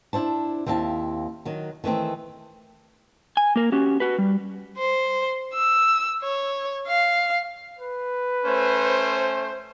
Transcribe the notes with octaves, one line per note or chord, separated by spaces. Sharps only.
D4 E4 C5 A5
D#2 C4 E4 F5 A5
D#3 F#3
D#3 E3 A3 C4
G#5
A#3 A#4
C#4 F#4 G4
F#4 B4
G3
C5
E6
C#5
F5
B4
A3 C#4 C5